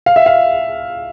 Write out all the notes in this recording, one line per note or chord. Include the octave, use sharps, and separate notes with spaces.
F5
E5
F5